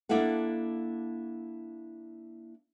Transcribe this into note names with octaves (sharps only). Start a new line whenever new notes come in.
A#3 D4 E4 A4 F5 F#5